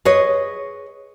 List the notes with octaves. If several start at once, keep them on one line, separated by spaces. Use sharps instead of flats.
G#4 B4 C#5 D#5